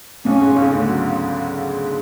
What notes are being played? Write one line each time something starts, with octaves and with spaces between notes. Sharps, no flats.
B1 B2 C#4
G#2
C#2 C#3
D2 D3
F#3